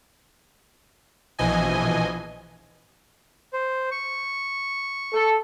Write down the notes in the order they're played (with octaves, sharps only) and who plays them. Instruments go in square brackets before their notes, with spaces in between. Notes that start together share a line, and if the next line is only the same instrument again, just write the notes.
[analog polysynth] A#1 B2 E3 F3 D#5 G#5
[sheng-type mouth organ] C5
C#6
[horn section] A4